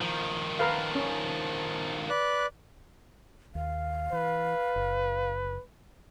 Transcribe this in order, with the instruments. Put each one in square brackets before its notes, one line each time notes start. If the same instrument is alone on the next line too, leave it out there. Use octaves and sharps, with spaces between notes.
[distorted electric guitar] D#3 F3
[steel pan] A#4 B4 F5 [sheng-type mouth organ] A5
[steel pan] C#4
[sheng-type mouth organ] B4 D5 F#6
[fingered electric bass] D#2 [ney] F5
[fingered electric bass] E3 [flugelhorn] B4
[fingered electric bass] F#1